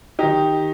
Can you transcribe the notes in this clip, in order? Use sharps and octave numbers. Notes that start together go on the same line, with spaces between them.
D#3 D#4 G4